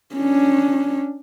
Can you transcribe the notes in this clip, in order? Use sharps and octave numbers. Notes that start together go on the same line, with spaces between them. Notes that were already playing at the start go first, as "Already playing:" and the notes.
C#4 D4